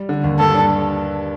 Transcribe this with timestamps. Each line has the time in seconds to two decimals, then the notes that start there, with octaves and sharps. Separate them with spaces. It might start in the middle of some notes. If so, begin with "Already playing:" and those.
Already playing: G3
0.09 D3
0.24 D#2
0.39 G2 A4
0.54 D4